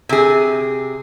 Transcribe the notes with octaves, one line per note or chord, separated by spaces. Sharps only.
C3 G#4